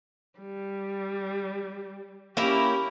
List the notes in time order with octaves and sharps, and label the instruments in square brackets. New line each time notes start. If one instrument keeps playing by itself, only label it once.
[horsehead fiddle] G3
[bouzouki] A#3 E4 A#4 [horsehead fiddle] C#4 G4